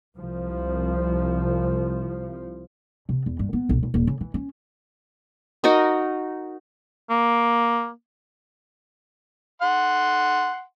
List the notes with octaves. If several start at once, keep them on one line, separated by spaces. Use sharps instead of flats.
C2 F3
C3
E2
G2
B3
B1
D#1
D#1
C#3
E3
C#4
D#4 F#4 A#4 D#5
A#3
F#5 C6